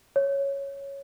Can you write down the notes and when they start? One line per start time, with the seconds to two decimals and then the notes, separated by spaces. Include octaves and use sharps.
0.16 C#5